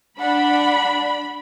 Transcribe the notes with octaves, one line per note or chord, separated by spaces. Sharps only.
D4 F#5 B5